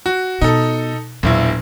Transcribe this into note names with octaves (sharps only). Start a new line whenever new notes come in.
F#4
B2 D#4 A4
E1 A#1 A#2 F#3 E4